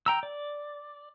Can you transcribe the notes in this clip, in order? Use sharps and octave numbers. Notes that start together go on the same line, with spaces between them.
G5 A#5 E6
D5